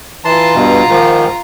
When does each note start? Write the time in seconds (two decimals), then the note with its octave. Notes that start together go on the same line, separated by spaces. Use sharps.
0.25 E3 F4 A5 A#5 C6
0.55 G2 B2
0.89 G#2 D#3 F3